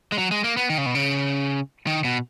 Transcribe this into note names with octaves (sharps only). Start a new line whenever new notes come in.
G#3
F#3
G#3
A#3
B3
D#3
C#3
B2
C#3
D#3
B2